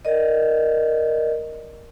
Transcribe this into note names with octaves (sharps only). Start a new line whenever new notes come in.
A#4 D5 D#5